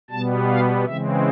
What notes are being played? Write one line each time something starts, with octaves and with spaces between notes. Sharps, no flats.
B2 G3 B3 A5
F5
C#3 E3 G#3 C4 E5